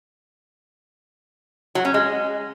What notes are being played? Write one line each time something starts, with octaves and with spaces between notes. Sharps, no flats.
F#3
C#4
G#3